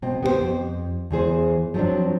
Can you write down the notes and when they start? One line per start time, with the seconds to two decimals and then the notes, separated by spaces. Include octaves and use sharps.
0.02 B2 C4
0.23 B3 G4 G#4 C5
0.41 F2
1.11 E2 E3 G#4 C5
1.74 F3 F#3 B3 C4 D4